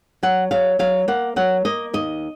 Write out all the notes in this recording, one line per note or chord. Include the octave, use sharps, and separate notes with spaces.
F#3 F#5
F#3 F5
F#3 F5
A#3 F#5
F#3 F#5
A#3 D#5
D#2 D#5